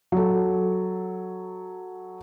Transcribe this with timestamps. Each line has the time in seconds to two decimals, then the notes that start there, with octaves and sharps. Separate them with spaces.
0.12 F#3 A4